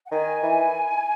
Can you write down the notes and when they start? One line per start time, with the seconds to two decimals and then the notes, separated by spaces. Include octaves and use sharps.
0.07 F#5
0.11 D#3 G#5
0.43 E3